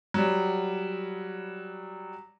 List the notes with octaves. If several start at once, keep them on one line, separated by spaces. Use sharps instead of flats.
F#3 G3